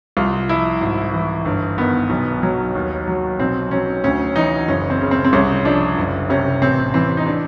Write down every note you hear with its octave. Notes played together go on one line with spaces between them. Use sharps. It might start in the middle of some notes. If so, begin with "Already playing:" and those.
C2 F4
F3 E4
G#1
E3
G1
D#3 B3
B1
F#3
D#2
F#3
B1 C4
F#3 C#4
D2 C#4
E3 D#4
F#1 C#4
C4
C#3
C4
C4
C2 C#4
F3 D4
F#1
C3 C#4
A1 C4
E3 C4
D#4
D4